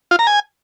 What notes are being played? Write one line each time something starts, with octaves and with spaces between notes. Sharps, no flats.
F4
A#5
G#5